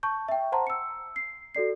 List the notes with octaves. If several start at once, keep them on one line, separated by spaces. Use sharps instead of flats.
A5 C#6 G6
E5 G5
C5 F#5 A5 A#5 C6
E6 C#7
C7
F#4 A4 D5 C7